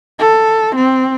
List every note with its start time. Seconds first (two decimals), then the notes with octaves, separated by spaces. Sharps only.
0.19 A4
0.75 C4